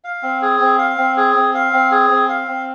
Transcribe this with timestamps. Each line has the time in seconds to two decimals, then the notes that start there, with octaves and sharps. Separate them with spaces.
0.04 F5
0.23 C4
0.42 G#4
0.60 C4
0.79 F5
0.98 C4
1.17 G#4
1.36 C4
1.55 F5
1.73 C4
1.91 G#4
2.10 C4
2.29 F5
2.48 C4